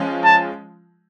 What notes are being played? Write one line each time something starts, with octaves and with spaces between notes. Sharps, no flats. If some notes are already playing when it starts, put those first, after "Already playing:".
Already playing: F3 G#3 C#4 F4
A5